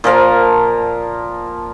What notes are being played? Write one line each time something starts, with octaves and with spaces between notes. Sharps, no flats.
A#2 F3 A#4 F5